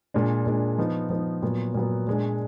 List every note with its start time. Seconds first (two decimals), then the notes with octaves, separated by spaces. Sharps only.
0.14 A#2 G#3 D4
0.46 A#2 G#3 D4
0.78 F3 B3 D#4
1.10 F3 B3 D#4
1.42 A#2 F#3 B3
1.74 A#2 F#3 B3
2.07 A#2 G#3 D4